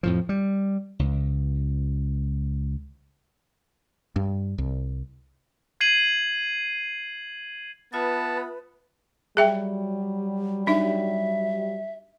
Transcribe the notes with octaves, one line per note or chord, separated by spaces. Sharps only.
F2 A2 F3
G3
C#2
G2
C2
G#6 C7 D#7 F#7
B3 F4 B4 E5 A5 D#6
F#3 G3 G#4 E5 G5
D4 D#4 E5